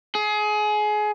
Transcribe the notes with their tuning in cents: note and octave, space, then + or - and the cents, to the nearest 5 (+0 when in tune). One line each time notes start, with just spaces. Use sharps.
G#4 +25